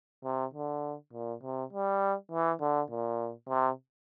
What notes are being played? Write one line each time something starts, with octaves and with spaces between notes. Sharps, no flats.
C3
D3
A#2
C3
G3
E3
D3
A#2
C3